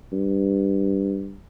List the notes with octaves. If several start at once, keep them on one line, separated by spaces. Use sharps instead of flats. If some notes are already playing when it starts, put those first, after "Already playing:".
G2